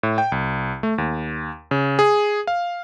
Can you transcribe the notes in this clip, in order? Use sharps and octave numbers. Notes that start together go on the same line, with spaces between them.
A2
G5
C2
A3
D#2
C#3
G#4
F5